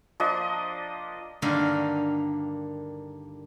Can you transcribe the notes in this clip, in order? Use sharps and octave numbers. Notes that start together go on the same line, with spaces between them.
F3 A#3 D4 D#5
G2 D3 D#3 A#3 F5